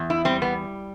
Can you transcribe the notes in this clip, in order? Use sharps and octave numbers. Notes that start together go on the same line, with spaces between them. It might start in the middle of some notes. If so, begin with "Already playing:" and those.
Already playing: E2
E4
G3 C4
B3